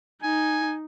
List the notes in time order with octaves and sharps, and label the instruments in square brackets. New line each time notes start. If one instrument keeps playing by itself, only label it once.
[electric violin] D#4 [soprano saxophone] G#5